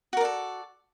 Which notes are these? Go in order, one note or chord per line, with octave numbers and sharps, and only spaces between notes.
F#4 A4 A#4 D5